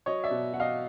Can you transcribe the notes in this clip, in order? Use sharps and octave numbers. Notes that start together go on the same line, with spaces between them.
F#3 C#5 D#5
D5 E5
B2
F#3 F#5
D#5 F5